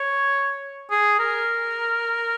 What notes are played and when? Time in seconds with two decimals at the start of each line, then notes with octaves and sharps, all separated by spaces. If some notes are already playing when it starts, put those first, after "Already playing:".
Already playing: C#5
0.91 G#4
1.19 A#4